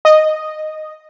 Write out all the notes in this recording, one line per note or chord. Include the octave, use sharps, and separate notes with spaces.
D#5